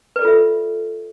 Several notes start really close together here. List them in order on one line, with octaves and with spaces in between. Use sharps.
B4 D5 A4 F4 E5